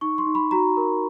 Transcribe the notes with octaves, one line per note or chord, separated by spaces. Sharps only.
D#4 C#6
C6
D#4
B5
F#4 A#5
A#4